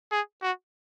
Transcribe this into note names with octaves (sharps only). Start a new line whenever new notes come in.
G#4
F#4